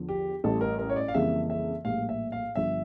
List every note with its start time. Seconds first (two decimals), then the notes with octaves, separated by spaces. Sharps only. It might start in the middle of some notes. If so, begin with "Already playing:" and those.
Already playing: E2 D3 F3
0.09 G4
0.44 A1 A2 G3 A4
0.61 A#4
0.79 A#4
0.90 C#5
0.96 D5
1.08 F5
1.14 F2 C#3 E3 G3 A#3 E5
1.50 E5
1.85 A#1 A2 G3 A#3 F5
2.09 E5
2.32 F5
2.56 G1 G2 D3 F3 E5